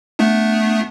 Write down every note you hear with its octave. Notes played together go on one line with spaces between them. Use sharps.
A3 B3 D4